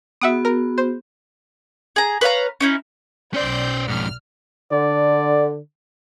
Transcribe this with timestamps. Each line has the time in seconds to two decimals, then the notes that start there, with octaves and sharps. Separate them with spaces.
0.21 B3 F#4 G#4 E5 F#5 D#6
0.45 A#4
0.78 C5
1.96 G#4 A#5
2.21 B4 C#5 F5 A#5
2.60 C#4 D#4 E4
3.34 B1 C#4 C5 D5 G6
3.88 F2 G#2 F6
4.72 D3 D5